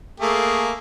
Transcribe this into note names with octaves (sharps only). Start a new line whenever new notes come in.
A3 A#3 G#4